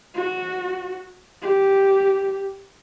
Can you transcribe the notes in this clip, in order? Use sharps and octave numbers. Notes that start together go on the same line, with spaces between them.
F#4
G4